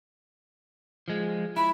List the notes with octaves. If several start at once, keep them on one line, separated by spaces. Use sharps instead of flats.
F3 G#3
E4 B5